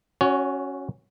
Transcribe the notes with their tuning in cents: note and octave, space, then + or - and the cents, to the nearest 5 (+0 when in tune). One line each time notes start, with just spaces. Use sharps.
C#4 -10 F#4 +0 C#5 +35